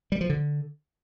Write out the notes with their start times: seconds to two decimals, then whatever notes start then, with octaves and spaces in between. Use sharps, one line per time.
0.12 G3
0.21 F3
0.30 D3